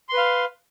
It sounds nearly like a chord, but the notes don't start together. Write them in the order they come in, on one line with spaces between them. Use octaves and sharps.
C6 B4 F5